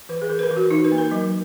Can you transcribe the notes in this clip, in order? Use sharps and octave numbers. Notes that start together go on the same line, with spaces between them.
E3 B4
G#4
E3 A#4
B4
A#4
E3
F#4
E3 D#4
B4
A#3
A#4
F#3